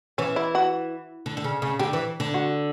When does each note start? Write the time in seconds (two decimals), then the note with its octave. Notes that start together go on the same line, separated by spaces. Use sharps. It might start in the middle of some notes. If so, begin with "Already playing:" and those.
0.18 E3 C#4
0.36 E4
0.55 F#4
1.26 D3
1.37 D3
1.44 C#3
1.62 C#3
1.79 D3 G4
1.93 E3
2.20 D3
2.34 F#4